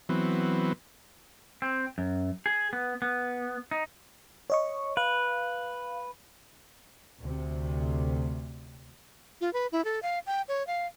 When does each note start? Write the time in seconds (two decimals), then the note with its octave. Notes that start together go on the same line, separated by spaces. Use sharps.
0.09 E3 F#3 B3 C4
1.62 C4
1.98 F#2
2.46 G#4
2.73 B3
3.02 B3
3.71 D#4
4.50 C#5 D#5 C#6
4.97 B4 F5
7.20 D2 C3
9.41 F4
9.53 B4
9.72 E4
9.85 A4
10.03 F5
10.26 G5
10.48 C#5
10.67 F5